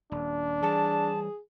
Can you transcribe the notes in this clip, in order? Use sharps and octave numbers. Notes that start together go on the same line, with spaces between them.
D#1 D4
E3 G3 G#4 A5